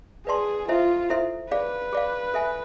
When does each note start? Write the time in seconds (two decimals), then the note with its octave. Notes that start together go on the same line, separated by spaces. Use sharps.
0.27 G#4 B4 D5 A5 C6
0.68 E4 F4 A4 C5 E5
1.10 E4 A4 C5 E5
1.51 G#4 B4 D5 F5
1.93 G#4 D5 F5
2.34 A4 E5 G#5